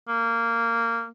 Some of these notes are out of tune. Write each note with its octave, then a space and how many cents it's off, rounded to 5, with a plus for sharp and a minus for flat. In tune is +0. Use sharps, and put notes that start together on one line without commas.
A#3 -15